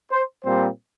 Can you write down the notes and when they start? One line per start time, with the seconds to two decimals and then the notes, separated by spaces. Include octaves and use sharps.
0.11 C5
0.44 A#2 G3 C4 C5